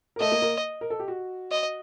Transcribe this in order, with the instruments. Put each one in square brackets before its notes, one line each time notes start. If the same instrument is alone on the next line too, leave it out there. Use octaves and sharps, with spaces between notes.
[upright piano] A#4
[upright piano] A3 A4 [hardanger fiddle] D#5
[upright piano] A#3 A#4
A#3 A#4
A#4
A4
G4
F#4
[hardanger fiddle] D#5